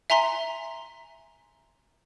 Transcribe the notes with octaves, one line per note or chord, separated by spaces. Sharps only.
E5 G#5 A#5 C6 B6